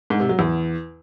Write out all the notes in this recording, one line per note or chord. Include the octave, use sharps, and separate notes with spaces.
G#2
C3
F#3
E2